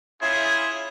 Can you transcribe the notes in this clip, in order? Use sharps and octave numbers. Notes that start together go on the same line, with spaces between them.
C#4 E4 F4 G#4